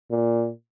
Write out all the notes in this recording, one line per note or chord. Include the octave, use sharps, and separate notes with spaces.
A#2